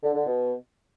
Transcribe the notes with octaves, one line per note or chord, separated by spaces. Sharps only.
D3
D3
B2